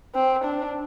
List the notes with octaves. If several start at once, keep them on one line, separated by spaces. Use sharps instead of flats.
C4
D4